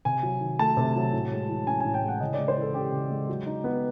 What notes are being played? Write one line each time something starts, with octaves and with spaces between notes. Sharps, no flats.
C3 G#5
F#3
D#3
A3 A5
C3
F#3
A2
G#3
E3
C#4 G#5
G#5
A2
G5
G#3
F#5
C#3 D#5
D5
G#3
C5
E3 A4
C#4 G4
C#3
G#3
F#3
D#4
B3